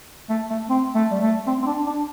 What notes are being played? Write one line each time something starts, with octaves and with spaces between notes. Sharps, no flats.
A3
A3
C4
A3
G3
A3
C4
C4
D4
D4